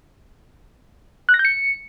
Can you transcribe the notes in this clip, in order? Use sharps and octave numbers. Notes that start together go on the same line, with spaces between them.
F#6
A#6
G6
C#7